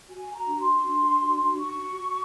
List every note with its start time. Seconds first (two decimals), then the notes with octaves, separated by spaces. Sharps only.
0.09 F#4 G#5
0.34 A#5
0.47 D4
0.59 C6
0.84 D4
1.21 F#4
1.59 F#4 C#6
1.96 F#4